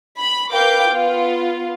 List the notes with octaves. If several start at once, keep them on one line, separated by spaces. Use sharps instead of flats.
B5
A#4 B4 F5 G5 D6 G6
B3 F4